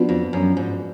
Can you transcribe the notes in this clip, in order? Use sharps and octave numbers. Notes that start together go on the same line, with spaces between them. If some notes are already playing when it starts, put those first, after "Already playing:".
Already playing: F3 B3 D4 F#4
F2
F#2
G#2